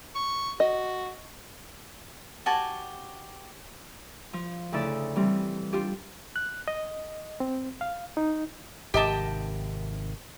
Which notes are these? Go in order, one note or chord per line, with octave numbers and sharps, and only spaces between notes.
C#6
F#4 D#5
F#4 G4 G#5 A5
F3
D2 C#3 E4 A4 D5
E3 G3 C4
D4 F4 G4
F#6
D#5
C4
F5
D#4
G#1 C3 D#3 G4 D#5 A5